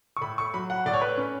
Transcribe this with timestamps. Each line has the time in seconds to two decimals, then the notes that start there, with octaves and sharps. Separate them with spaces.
0.17 C#6
0.21 A2 B5
0.38 C#6
0.54 F#3 B5
0.70 F#5
0.86 A2 D5
0.94 C#5
1.01 B4
1.18 C#4